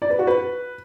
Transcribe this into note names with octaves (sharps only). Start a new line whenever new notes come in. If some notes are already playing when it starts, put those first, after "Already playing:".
D5
B4
F#4
B4